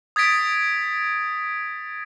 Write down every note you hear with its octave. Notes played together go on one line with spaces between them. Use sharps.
D#6 G#6 A6 B6 D7